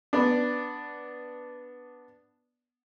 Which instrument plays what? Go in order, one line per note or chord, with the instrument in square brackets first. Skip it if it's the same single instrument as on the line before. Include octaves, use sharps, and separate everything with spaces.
[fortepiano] B3 D4